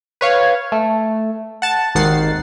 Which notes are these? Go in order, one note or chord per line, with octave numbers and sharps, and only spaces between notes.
B4 C#5 F5
A3
F#5 A5
G#1 D#2 D#3 F#5 A6 C7